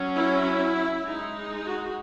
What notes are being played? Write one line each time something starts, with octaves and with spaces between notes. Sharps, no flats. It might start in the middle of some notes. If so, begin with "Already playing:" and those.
Already playing: F#3 C#4
E4
G#3 D#4
F#4